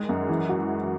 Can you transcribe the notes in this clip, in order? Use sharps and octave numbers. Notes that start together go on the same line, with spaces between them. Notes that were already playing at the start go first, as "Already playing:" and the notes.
Already playing: D#3 G#3
F#2
E3
F#4